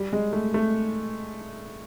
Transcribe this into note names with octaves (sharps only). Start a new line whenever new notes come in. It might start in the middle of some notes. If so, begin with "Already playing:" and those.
Already playing: G3
G#3
A3
A3